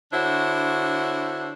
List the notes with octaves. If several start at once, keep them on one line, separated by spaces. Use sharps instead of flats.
D3 D4 E4 F#4 C5 C#5